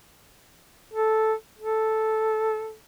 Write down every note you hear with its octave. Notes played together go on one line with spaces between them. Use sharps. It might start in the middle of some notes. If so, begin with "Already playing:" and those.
A4
A4